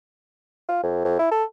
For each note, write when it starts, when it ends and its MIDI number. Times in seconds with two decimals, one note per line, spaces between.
0.69 0.83 65
0.83 1.04 41
1.05 1.18 41
1.19 1.27 64
1.31 1.44 69